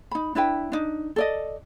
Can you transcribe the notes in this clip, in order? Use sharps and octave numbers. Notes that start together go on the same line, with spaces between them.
D#4 B5
D4 E4 B4 G5
D4 D#4
A4 D5 D#5